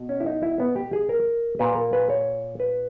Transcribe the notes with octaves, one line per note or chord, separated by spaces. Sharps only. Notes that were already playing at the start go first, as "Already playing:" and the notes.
Already playing: B2
C#4
E4
D#4
E4
B3
G4
G#4
A#4
A#2 B4
A#4
B4
C#5
B4